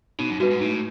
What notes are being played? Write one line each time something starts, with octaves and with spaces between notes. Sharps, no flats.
B2 D#4
F#2
G2 F#4 B4
G#2
A2 D#4